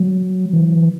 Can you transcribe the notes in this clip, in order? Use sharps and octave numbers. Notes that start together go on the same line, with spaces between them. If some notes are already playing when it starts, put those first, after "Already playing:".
Already playing: F#3
E3